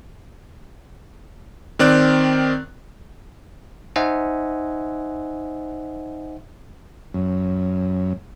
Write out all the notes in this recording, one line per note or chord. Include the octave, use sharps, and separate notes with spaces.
D#3 C4 D5 F#6
D#4 C5 D#5 E5 F#5 G#5
F#2